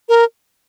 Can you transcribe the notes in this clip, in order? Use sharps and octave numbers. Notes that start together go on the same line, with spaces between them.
A#4